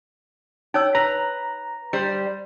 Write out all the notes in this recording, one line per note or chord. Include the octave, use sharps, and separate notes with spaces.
D#4 C#5 G5 E6
B4 A#5
G3 C5